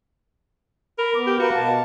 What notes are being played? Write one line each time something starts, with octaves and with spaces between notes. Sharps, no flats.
A#4 B5
B3 D6
G4
F#4 A#4 B4 F5 F#5
B2 F5 A5